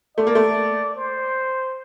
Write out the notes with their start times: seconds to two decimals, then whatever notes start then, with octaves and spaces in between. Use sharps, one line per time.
0.17 A3 D5
0.27 A#3
0.35 A3
0.96 C5